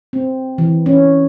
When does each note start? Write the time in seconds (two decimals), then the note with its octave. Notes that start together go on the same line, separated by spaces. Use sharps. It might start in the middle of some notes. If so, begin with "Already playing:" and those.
0.13 C4
0.58 E3
0.86 C#4